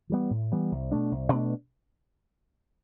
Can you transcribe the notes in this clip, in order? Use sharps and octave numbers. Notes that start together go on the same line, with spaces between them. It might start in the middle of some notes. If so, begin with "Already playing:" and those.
E3 G3 B3
A2
E3 G3 B3
C2
B2 A3 D4
C2
B2 A3 D4